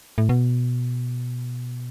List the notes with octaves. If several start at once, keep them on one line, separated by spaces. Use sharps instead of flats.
A2
B2